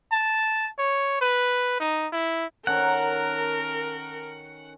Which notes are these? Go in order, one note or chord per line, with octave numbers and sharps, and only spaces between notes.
A5
C#5
B4
D#4
E4
D#3 C#4 A4 A#4 F#5